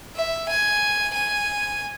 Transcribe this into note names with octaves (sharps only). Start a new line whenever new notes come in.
E5
G#5
G#5